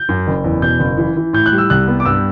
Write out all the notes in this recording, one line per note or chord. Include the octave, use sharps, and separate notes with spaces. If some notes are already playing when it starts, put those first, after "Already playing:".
Already playing: G6
F#2
F#1
E2
B2 G6
F#1
E3
E3
A2 G6
F#6
G3
E6
C2 F#6
B3
D6
G2 E6